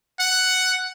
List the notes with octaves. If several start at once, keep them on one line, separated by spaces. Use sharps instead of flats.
F#5